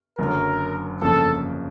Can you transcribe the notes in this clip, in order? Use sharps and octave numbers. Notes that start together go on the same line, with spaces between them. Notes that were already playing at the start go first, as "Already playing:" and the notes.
F#1 F#2 D3 F#3 A#4
G1 F2 C#3 F3 A#3 A4